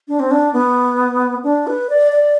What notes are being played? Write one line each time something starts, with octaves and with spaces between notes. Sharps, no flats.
D4
C4
D4
B3
D4
B4
D5
D5